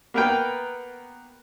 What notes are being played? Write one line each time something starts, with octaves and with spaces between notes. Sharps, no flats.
A#3 B3 A#4 B4 G5